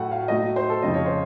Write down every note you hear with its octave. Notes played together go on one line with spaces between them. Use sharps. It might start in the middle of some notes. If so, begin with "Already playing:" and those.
Already playing: A2 F#3 A3 F#5
F5
A2 F#3 A3 D#5
C5
A4
F2 C#3 F3 D#5
C#5
C5